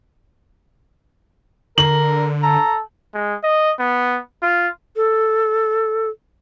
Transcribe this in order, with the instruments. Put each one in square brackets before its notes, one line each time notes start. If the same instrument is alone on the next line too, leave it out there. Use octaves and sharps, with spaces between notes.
[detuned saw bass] D3 [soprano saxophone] A#4 [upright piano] F#7
[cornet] A4 [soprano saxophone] A#5
[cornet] G#3
D#5
B3
F4
[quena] A4